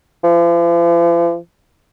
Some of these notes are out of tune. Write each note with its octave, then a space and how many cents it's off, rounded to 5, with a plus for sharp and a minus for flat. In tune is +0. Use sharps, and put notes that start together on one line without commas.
F3 -45